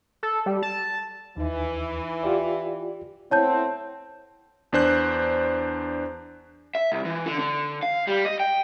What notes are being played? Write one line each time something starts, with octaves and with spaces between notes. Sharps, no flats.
A4
G3
A5
D#2 E3 D#4
F4 G4 D5
A3 B3 C4 E4 C#5 A5 G6
E2 D4 C5 F#6
E5
C2
E3
D3
D3
F5
G3
D#5
G5